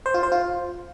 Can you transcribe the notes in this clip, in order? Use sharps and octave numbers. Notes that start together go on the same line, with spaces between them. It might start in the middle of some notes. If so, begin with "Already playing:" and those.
C5
F4
C5
F4